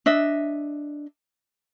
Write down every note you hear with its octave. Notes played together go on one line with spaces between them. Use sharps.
D4 D#5 E5